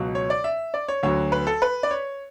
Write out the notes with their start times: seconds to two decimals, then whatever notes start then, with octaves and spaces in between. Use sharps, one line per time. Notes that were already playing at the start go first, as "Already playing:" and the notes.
Already playing: C#2 B2 F#3
0.15 C#5
0.30 D5
0.44 E5
0.74 D5
0.88 C#5
1.03 D2 D3 F#3 C#5
1.32 B4
1.47 A4
1.62 B4
1.83 D5
1.91 C#5